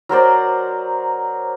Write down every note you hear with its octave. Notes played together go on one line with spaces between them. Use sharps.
F#3 A#4 C5 D5